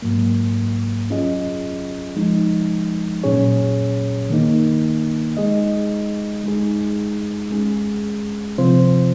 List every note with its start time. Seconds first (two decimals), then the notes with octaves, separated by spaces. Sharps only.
0.02 G#2 F#3 A#3
1.10 F#3 C#4 F4 G#4 D#5
2.16 F3 G#3 D#4
3.23 A#2 F#3 C#4 G#4 C#5
4.30 D#3 A#3 D#4
5.37 G#3 D#4 G#4 D#5
6.44 G#3 D#4 G#4
7.51 G#3 C#4 G#4
8.58 C3 F3 C4 F4 C5